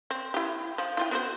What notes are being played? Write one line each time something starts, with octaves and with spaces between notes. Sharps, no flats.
C4
E4 G4
F3
E4 F4 G5
B3 F#4 C5